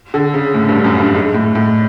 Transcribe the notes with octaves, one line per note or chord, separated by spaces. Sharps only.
D3
C#3
A2
G2
F#2
G2
G#2
A2
A2